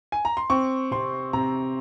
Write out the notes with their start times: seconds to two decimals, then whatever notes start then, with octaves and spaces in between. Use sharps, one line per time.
0.12 G#5
0.25 A#5
0.37 C6
0.50 C4 C#6
0.91 C3 C6
1.33 C3 A#5